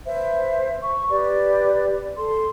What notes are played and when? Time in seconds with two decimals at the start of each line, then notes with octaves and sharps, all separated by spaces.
0.05 B4 C5 E5
0.82 C#6
1.10 G4 B4 D5
2.17 A4 C6